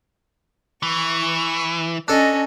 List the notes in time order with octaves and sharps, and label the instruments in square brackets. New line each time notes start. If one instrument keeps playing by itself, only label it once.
[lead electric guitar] E3 [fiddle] C#6
[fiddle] C#4 [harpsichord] D4 A4 [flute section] D#5